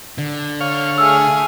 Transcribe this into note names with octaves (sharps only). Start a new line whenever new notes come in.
D3
C#5 F5
A3 G#4 E6 F6